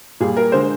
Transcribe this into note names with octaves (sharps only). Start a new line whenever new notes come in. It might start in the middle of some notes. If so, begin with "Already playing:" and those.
A#2 G3 G#4
A#4
D3 G#3 C5